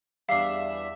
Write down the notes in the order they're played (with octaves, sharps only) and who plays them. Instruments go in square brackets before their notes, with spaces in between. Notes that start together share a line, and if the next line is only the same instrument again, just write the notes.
[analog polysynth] E2 E5 [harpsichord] G3 D4 [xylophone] F5 C7